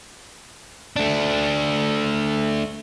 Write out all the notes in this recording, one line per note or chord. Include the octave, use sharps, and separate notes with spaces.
A3 D4